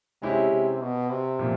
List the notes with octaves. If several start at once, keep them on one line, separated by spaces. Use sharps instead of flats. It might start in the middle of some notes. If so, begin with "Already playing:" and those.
C3 G#3 C#4 E4 G4
C3
B2
C3
A#2 F3